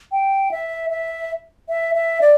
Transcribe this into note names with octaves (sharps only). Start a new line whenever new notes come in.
G5
E5
E5
E5
E5
D5